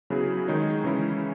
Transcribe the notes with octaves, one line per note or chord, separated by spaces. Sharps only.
C#3 F#3 B3 E4 G#4
D#3 G#3 D#4 G#4 C#5
C#3 E3 G#3 C#4 E4